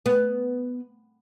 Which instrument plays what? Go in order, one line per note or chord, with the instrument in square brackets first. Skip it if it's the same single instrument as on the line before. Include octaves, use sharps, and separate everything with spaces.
[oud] B3